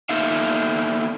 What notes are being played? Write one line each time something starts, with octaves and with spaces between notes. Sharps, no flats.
A#3 B3 D#4 A4 E5 F5